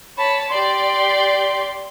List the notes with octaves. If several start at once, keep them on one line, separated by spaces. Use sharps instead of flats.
C#5 A5 B5
G4 D5 C6